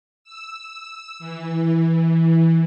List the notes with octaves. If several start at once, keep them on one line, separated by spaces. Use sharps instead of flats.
E6
E3